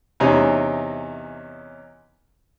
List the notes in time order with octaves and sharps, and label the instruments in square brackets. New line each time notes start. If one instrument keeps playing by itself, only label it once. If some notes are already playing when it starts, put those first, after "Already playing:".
[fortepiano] E2 C3 C#4 D#4 G#5 A#5